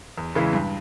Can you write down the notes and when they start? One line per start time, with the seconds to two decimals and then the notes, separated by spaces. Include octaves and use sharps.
0.18 E2
0.35 C#3 E3 G#3 E4
0.53 G2